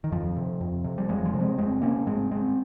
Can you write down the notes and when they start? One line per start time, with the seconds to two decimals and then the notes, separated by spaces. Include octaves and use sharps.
0.04 D#3
0.12 F2 F3
0.37 C3
0.61 F2
0.84 C3
0.98 G3
1.09 F2 F3 G#3
1.25 F3 G#3
1.34 C3
1.41 G#3 C4
1.58 F2 G#3 C4
1.82 C3 A#3 C#4
2.07 G#2 G#3 C4
2.31 G#3 C4